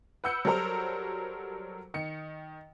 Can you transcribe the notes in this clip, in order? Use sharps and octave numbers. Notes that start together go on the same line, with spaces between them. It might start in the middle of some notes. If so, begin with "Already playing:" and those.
B4 F#5 E6 G6 C#7
F#3 G3 A4 A#4 C5 A#5
D#3 C#7